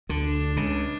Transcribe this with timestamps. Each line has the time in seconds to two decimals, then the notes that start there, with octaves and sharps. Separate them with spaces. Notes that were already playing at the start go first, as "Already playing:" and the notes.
0.09 D2 D3
0.25 D4
0.56 C#2 C#3